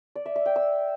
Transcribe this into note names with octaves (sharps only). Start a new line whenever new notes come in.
D5
E5
E5
G5
E6